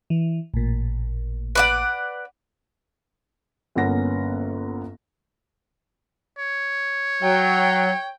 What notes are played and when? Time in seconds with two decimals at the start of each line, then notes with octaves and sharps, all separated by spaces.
0.10 E3
0.54 A1 A#2
1.55 B4 D5 F#5
3.75 G1 A#3 B3 C#4 F#5 A#6
6.38 C#5
7.23 F#3 G5